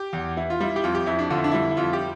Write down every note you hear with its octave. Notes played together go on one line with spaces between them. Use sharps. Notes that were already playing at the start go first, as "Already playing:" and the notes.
Already playing: G4
E2
E3 E4
F4
G3 E4
G4
F2 F4
G4
F2 E4
D4
D3 F4
E4
D4
G3 E4
E4
F2 F4
G4